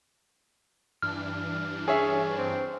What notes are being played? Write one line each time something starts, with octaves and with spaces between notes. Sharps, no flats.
G2 E3 D4 F6
C#4 G#4 C#5 E5
C4